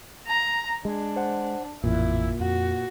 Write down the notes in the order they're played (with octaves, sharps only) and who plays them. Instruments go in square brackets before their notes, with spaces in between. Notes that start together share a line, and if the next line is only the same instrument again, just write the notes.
[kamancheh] A#5
[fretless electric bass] G#3 [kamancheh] D4
[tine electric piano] C5 F#5
[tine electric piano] A1 F2 [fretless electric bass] A#2 [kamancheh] E4
[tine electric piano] F2 [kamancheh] F#4